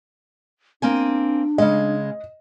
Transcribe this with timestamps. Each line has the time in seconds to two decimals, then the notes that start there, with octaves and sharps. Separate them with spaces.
0.82 A#3 C4 D4 G#5
1.58 C#3 G#3 D#5